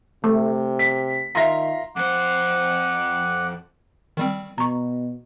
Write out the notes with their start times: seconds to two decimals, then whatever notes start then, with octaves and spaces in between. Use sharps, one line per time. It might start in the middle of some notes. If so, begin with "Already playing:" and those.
0.24 C3 A3
0.79 B6
1.35 D#3 F4 E5 F5 A#5 C6 A#6
1.96 F2 C5 F#5 D6
4.17 D#3 G3 C4
4.58 B2 A#5 C#6